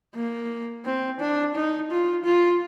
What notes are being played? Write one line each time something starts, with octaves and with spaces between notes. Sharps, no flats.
A#3
C4
D4
D#4
F4
F4